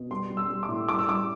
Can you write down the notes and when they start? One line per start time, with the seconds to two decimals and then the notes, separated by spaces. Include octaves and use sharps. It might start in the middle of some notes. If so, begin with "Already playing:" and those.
Already playing: B2
0.10 G3 C6
0.30 G3
0.37 E6
0.50 G3
0.63 D6
0.69 A2
0.88 G3 D6
0.99 E6
1.08 G3 D6